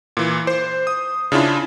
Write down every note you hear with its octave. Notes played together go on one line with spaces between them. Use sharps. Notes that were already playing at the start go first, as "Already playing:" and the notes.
A#2 E3
C5
D#6
C#3 D4 E4 F4